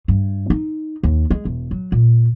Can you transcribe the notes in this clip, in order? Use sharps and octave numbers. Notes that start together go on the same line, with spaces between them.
G2
D#4
D#2
G#3
E1
F#3
A#2